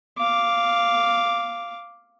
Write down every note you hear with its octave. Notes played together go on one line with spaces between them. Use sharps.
F5 D6